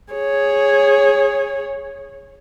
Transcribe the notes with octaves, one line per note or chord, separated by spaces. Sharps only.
G#4 C#5